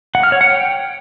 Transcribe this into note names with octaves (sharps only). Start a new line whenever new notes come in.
F#5
F6
C#5
F#5
G5